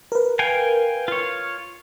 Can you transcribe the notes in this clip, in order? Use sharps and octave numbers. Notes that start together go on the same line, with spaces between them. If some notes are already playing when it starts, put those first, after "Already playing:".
A#4 B4
F5 G5 G#5
F4 C#5